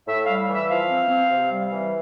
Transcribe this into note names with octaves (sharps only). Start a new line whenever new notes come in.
A2 E5
G3 F5
E3 E5
F3 F5
C4
C4
C3
G3
E3